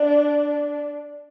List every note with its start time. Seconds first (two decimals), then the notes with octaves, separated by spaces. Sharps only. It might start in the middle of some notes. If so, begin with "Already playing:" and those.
Already playing: D4